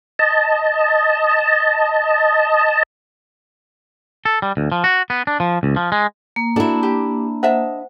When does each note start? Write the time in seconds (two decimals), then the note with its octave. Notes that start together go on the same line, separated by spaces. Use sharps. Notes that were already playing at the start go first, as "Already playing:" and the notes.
0.19 D#5 A5
4.25 A4
4.42 G3
4.57 D2
4.72 F3
4.84 F#4
5.10 B3
5.27 D4
5.40 F3
5.63 C#2
5.76 F3
5.92 G#3
6.36 A#3
6.56 D4 E4 F#4 A4
6.83 G4
7.43 C5 D#5 E5 F#5 A5